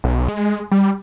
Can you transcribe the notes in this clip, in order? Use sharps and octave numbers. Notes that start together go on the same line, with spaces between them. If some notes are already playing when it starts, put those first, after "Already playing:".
B1
G#3
G3